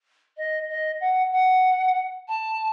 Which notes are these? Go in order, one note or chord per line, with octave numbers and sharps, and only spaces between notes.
D#5
D#5
F#5
F#5
A5